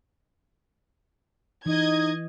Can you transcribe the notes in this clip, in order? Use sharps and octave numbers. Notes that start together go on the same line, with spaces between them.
E3 D#4 D#5 G#6